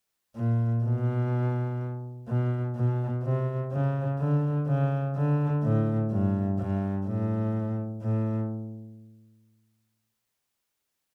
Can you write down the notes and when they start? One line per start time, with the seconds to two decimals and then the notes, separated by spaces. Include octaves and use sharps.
0.36 A#2
0.84 B2
2.28 B2
2.75 B2
3.23 C3
3.72 C#3
4.19 D3
4.67 C#3
5.15 D3
5.62 A2
6.11 G2
6.58 G2
7.06 A2
8.02 A2